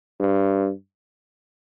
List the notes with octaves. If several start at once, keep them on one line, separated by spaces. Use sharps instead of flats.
G2